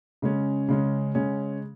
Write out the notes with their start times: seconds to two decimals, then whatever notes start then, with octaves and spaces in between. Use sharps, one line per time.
0.22 C#3 G#3 C#4
0.69 C#3 G#3 C#4
1.15 C#3 G#3 C#4